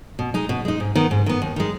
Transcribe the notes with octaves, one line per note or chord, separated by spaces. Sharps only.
B2
G#3 D#4
B2
G#3 D#4
G#2
D#3 B3
G#2
D#3 B3
D#2
D#3 G#3